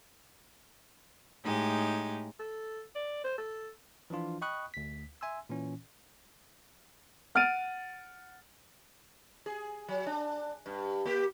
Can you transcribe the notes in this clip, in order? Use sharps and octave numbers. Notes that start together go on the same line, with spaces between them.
A2 G#3 D#4 G4
A4
D5
C5
A4
E3 F3 D4 F4
D#5 G5 B5 C#6 D#6 F#6
D2 B6
E5 G#5 C6 E6
A#2 E3 C#4
F#5 F6 A6 D7 D#7
G#4
F#3
D4
G2
A#3 G4